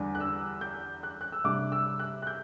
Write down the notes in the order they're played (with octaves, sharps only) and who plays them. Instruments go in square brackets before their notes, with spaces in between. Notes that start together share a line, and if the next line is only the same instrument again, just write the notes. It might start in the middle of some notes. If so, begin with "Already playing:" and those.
Already playing: [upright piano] E2 D3 G3 D4
F#6
E6
G6
F#6
F#6
E6
C3 G3 D4 D6
E6
F#6
F#6
G6